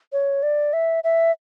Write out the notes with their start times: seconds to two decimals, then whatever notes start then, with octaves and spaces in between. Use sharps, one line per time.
0.12 C#5
0.43 D5
0.73 E5
1.04 E5